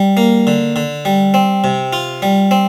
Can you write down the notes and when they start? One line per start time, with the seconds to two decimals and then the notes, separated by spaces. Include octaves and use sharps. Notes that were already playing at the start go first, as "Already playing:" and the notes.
Already playing: G3
0.17 A#3
0.47 D3
0.76 D3
1.05 G3
1.34 C4
1.64 C3
1.93 F4
2.22 G3
2.51 C4